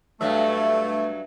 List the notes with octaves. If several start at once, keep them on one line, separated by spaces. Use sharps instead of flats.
G2 F#3 A3 E5